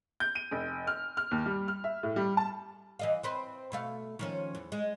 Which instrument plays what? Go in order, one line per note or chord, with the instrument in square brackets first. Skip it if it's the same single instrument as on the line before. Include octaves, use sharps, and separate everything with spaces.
[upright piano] G6
D#7
F1
F6
F6
D#2
G3
F6
E5
A2
G3
A5
[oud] E3 D#5 F5
C4 B4 C5
B2 A3 F5
D#3 F3 C#4
E2
G#3